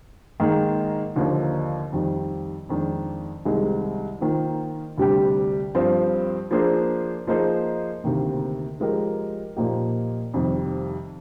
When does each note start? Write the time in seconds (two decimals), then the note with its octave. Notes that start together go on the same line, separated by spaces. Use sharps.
0.40 G#2 D#3 A#3 D#4 G#4
1.16 D#2 D3 F3 A#3 D#4
1.92 F2 D#3 G3
2.69 F2 D#3 G#3 D4
3.45 C2 C3 D#3 G#3 D#4
4.21 D#3 A#3 F4 C5
4.98 D2 C3 G3 D4 G4
5.75 G2 F3 C4
6.51 F3 A#3 D4 G#4 C5
7.27 F3 A#3 D#4 G#4 C5
8.04 D2 C3 D#3 A#3
8.80 F3 G#3 D#4 G4 A#4
9.56 A#2 F3 A#3 D#4 G4
10.34 F2 C3 D#3 G3